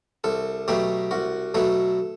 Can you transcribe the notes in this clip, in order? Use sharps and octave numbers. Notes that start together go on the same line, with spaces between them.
C2 A4
B2 F#3 A3 G4
C2 F#4
B2 F#3 A3 A4